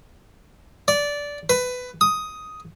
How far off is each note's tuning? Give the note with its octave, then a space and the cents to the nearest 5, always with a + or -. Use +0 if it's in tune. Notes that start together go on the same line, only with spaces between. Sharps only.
D5 -15
B4 +15
D#6 +5